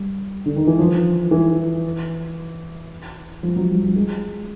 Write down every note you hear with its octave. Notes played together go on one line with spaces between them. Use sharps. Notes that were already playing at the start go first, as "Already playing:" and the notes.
Already playing: G3
D3
D#3
E3
F3
E3
F3
F#3
G3
G3
G#3